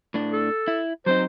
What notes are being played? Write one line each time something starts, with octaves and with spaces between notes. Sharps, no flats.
A2 D4
A4
E4
F#3 C4 D#4 C5